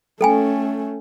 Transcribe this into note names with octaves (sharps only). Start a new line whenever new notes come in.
A3 C#4 A4 G5 G#5